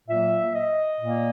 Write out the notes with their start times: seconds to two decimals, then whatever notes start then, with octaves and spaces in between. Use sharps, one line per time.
0.08 A#2 F#3 A#3 E5
0.54 D#5
1.00 A#2 A#3